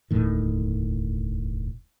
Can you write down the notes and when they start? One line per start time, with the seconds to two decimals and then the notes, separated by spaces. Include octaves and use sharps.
0.11 E1 D2 A2 D#3